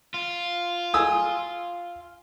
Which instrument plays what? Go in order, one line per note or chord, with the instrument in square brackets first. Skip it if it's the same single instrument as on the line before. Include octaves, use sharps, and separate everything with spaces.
[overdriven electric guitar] F4
[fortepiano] G#5 D#6 E6